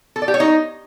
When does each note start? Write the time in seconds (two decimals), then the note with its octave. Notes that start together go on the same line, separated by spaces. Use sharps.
0.16 A4
0.22 D5
0.28 G4
0.34 C#5
0.40 D#4